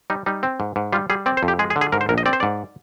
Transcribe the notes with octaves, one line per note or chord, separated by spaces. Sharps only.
G3 D#4
G3 D#4
C4
G#2
G#2
G3 F4
G3 G#4
C4 D5
C5
F2
G4
G#3 G#4
G#4
D3
G#4
G#2 A#4
C5
A#1 A#4
D#5
C4 D5
C5
G#2 D5